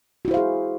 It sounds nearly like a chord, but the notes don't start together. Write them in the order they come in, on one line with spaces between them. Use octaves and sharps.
F#4 E4 C5 F5 G#4